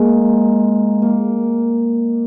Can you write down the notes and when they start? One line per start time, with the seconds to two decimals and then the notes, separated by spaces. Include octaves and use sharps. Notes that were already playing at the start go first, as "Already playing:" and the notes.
Already playing: G#3 A#3
1.02 A#3